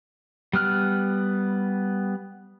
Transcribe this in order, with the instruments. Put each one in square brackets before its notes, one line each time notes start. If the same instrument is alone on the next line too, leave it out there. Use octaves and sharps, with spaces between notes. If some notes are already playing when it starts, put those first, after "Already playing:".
[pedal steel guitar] G3 B3 F6 F#6